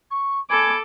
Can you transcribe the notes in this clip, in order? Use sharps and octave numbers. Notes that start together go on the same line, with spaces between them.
C#6
A4 G#5 B5 D6